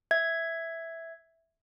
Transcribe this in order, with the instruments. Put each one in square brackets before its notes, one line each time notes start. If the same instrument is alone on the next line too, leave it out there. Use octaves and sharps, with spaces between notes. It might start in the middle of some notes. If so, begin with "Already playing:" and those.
[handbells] E5 G#6